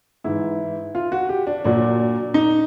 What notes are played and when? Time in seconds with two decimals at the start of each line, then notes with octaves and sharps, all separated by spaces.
0.24 G#2 E3 E4
0.95 F4
1.12 F#4
1.29 G4
1.47 D4
1.64 A#2 F#3 D4
2.34 D#4